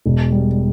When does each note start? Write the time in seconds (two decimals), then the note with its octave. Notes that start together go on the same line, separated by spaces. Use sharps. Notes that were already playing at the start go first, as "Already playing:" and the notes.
0.06 E1
0.32 G3